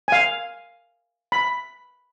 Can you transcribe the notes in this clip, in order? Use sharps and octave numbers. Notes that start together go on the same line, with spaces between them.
F5 G#5
B5